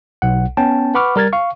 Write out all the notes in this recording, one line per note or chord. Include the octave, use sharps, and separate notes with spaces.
B1 F#5
B3 C#4 G5 A5
B4 F#5 B5 C#6 D6 F6
G3 A#4 F6 G#6 A6
F5 C#6